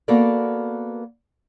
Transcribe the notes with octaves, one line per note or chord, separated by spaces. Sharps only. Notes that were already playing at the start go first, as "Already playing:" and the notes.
A#3 B3 F#4 A4 A#4 D5